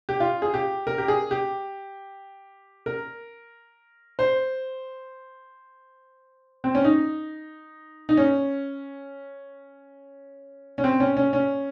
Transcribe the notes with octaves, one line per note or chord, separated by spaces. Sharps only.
G4
F4
G#4
G4
A#4
G4
G#4
G4
A#4
C5
C4
C#4
D#4
D#4
C#4
C#4
C4
C#4
C#4
C#4